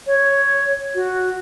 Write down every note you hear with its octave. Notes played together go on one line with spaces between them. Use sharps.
C#5
F#4